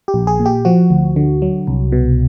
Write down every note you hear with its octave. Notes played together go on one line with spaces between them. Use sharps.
G4
A#1
G#4
A#2
G4
F3 F#4
D2
D3
F#3
C2
B2